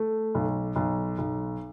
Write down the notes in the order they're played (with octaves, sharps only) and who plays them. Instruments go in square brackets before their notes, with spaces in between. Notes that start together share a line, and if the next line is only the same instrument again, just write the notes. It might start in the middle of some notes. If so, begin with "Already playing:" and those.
Already playing: [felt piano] A3
B1
B1
B1